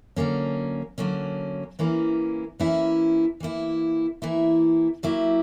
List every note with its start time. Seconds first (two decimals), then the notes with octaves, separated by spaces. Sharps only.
0.16 D3 F#3 A#3 C#4
0.98 D3 F#3 A#3 C#4
1.79 E3 A#3 C#4 E4
2.60 E3 A#3 C#4 E4
3.40 E3 A#3 E4
4.22 E3 A#3 E4
5.03 F#3 A#3 E4 G4